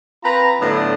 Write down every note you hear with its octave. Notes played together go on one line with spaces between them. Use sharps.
C4 F4 B4 A#5
A2 D3 F#3 B3 D4 E4